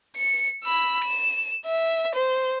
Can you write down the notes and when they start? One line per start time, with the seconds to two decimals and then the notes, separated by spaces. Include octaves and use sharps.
0.17 C#7
0.64 B5 E6
1.04 E7
1.66 E5
2.15 C5